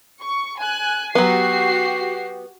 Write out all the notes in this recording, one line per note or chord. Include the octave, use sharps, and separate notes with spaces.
C#6
G#5 F#6
F#3 B3 F#4 G4 C7